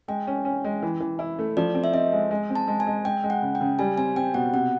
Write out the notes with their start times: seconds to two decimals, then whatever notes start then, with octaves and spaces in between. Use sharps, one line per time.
0.08 G#3 G5
0.27 C#4
0.45 C#4
0.64 G#3
0.83 E3
1.00 E3
1.19 E4
1.39 A3
1.57 F3 D5
1.75 C4
1.84 E5
1.93 C4 D#5
2.12 G#3
2.31 G#3
2.50 C4
2.55 A5
2.68 G#3
2.80 G#5
2.87 G#3
3.05 G#3 G5
3.24 G#3
3.30 F#5
3.42 C#3
3.55 G5
3.61 C#3
3.79 G3 G#5
3.98 C4 G#5
4.16 C4 G5
4.34 B2 F#5
4.54 C3 F#5